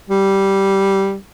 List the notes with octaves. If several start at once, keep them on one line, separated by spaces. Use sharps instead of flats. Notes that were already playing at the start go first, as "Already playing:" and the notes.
G3